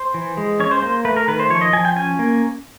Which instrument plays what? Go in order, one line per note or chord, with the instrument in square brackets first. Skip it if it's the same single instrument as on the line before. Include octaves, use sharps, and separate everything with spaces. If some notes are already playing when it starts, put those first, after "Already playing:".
Already playing: [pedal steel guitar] C5
E3
G#3
C#4 C#5
C5
A#3 C5
A3 B4
A#4
D#3 B4
C5
F3 C#5
D#5
F3 G#5
G5
C#4 G#5
A#3